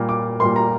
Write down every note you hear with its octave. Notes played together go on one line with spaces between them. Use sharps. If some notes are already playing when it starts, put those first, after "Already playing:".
Already playing: A#2 G3 A#3
D6
A#2 G3 A#3 C6
A#5